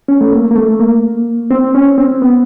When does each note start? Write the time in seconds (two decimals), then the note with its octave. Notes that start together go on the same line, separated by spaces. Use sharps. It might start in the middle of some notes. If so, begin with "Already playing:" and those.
0.08 C#4
0.21 A3
0.32 A#3
0.51 A#3
0.56 A3
0.80 A#3
1.51 C4
1.75 C#4
1.98 C4
2.22 B3